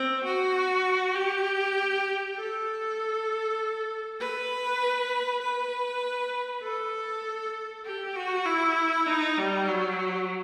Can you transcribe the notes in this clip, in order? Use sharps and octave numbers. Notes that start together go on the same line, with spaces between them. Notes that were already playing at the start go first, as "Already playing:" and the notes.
Already playing: C4
F#4
G4
A4
B4
B4
A4
G4
F#4
E4
D#4
G3
F#3